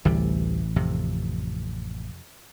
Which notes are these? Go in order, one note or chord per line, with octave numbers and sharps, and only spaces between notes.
A1 D2 C3 E3 G3
F2 C3